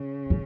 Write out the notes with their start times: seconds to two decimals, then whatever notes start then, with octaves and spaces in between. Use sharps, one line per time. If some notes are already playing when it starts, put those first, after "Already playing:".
Already playing: C#3
0.30 C#4